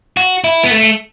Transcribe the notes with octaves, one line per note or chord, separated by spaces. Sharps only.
F#4
E4
B3
A3